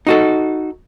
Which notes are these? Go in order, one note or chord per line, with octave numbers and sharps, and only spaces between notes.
D#4 F#4 A4